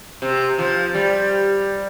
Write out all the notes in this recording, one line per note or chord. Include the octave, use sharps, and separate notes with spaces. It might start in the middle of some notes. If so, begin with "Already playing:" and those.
C3
F3
G3